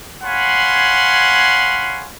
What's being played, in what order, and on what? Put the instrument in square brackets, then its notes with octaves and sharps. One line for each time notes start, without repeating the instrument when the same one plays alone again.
[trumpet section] C#5 F5 F#5 G#5 B5 C6